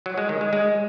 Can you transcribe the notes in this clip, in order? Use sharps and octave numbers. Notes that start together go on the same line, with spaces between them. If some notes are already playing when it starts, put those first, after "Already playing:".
F#3
G#3
D#3
G#3
G#3